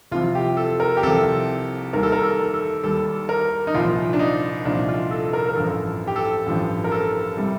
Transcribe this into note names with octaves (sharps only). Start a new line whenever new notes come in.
C2 C3 F3 F4
G4
A4
A#4
G4
C2 C3 F3 A4
D#2 D#3 G3 A#4
A4
A#4
A4
A4
D#2 D#3 G3 A4
A#4
D#4
C2 A#2 F3 F4
D4
D#4
C2 A#2 F3 D4
F4
A4
A#4
A#4
A1 G2 F3 A4
G4
A4
A1 G2 F3
A#4
A4
C3 G3